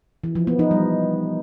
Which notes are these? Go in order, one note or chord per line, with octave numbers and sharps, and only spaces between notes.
E3
F3
B3
D#4
G3